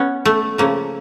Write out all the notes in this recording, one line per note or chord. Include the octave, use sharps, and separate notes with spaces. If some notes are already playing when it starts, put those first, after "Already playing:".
Already playing: B3 C#4
A3
C#3 F3 A3 A#3